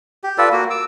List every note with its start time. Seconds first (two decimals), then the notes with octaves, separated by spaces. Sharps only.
0.24 G4
0.38 F4 A4 B4 D5
0.52 A#3 F#4
0.70 D6 E6